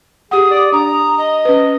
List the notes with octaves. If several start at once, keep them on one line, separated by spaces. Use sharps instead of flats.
G4 G#4 F#5 D#6
D5
D4 A#5 D#6
D#5
C#4 B4